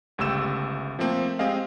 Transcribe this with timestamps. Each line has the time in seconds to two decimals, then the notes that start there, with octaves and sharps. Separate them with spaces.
0.18 G1 C#2 A3 G4 E6 E7
0.99 F3 A3 A#3 C4
1.39 G#3 C4 G4 G#4 D#5 F5